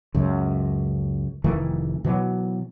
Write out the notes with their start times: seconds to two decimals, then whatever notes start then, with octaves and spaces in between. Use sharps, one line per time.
0.14 C#2 F#2
1.44 F1 D#3 E3 A3
2.04 B2 E3 F#3 B3